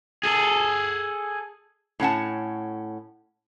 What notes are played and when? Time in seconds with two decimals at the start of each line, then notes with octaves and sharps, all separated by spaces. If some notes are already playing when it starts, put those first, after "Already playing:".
0.23 G#4 A4
2.00 A2 C#4 F#5 A5